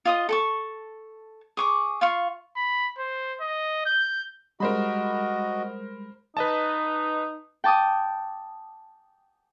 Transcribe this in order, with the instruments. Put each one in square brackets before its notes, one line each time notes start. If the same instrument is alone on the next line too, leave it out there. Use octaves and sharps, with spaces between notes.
[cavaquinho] F4 D#5 D#6
A4 A5 C#6
G#4 C#6 D6
F4 F5 C#6
[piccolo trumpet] B5
C5
D#5
G6
[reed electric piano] G3 G#3 [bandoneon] F#4 D#5 [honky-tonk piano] A#4 C5 B5
[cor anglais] D#4 [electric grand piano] B4 D#5 A5
[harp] G5 A5 D6 D#6